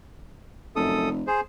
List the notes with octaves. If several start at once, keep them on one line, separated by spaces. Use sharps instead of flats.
F1 F#2 A4 D#6
G#4 C5